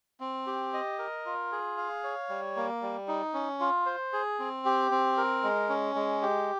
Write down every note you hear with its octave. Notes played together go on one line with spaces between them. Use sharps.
C4
G4
D#5
A#4
F4
G#4
F5
C#5
G3
A#3
G3
D#4
C#4
F4
C5
G#4
C4
G4
C4
A#4
G#3
C#4
G#3
G4